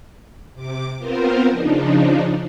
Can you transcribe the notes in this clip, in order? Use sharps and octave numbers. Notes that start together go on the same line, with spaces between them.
C3 D6
B3 C4 F4 A#4 C5
C#3 F3 D4 D#4